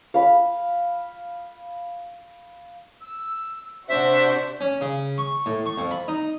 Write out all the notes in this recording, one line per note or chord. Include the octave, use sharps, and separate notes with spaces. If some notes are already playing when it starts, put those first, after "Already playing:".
F5 B5
E6
C3 D4 F#4 C5 E5
C#4
C#3
C#6
A2
C#6
F2
B5
D#4